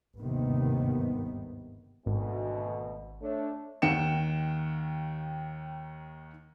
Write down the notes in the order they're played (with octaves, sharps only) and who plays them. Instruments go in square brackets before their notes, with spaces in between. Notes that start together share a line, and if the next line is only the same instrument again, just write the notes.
[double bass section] G1 D#2 G#2 C3 D#3 B3
[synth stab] G#1 [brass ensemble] D2 B2
[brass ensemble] A3 D4 C#5
[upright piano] D#2 D#3 F#5 G5 C#7 E7